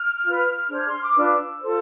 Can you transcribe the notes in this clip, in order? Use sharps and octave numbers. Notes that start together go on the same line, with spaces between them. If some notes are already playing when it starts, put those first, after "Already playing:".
Already playing: F6
F4 B4
D4 G#4 C5
C6
D6
D4 F4 B4 E6
F4 A4 C5